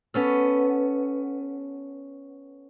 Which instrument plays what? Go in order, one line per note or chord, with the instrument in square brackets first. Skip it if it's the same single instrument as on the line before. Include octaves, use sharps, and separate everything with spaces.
[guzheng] B3 C#4 A4